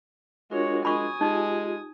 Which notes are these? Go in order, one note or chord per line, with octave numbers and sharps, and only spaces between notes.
G#3 D4 F4 F#4 A#4 C#5
G#3 G#5 B5 C#6 D#6
G#3 D#4 F4 G4